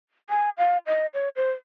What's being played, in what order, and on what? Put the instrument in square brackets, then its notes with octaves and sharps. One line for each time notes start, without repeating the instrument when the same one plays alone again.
[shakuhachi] G#5
F5
D#5
C#5
C5